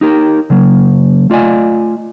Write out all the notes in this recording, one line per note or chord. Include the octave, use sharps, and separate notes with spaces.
D#4 G4 A#4
C#3 F#3 A#3
A3 F4 D5 D#5 G#5